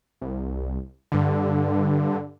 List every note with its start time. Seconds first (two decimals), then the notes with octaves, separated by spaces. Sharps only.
0.22 C2
1.12 G2 D3